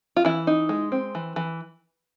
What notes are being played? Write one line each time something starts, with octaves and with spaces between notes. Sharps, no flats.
F4
E3 E4
D#4
G#3
C4
E3
E3